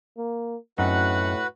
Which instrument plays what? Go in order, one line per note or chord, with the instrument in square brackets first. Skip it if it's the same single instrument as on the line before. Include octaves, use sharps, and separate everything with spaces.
[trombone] A#3
[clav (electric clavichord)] F#2 C4 D#4 [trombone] A2 [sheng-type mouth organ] F#4 B4 F#5